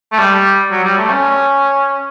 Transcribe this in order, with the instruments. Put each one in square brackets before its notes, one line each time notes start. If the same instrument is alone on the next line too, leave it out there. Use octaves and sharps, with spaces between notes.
[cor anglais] A3
G3
F#3
G3
A3
C#4